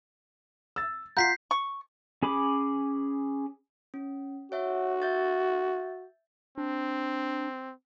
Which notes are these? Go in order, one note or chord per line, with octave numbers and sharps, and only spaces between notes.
E6 A6
F4 F#5 A#5 G6 B6 C7
C#6
C#4 G#4 B5 D6
C#4
F#4 C#5 E5 F#5
E5 G6 A6
C4 D4